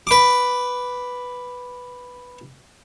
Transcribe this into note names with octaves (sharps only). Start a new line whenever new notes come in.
B4 D6